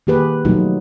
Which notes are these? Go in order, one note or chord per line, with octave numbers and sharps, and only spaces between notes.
D#3 A#3 G4 G#4 B4
B2 F3 F#3 A3 D#4 F4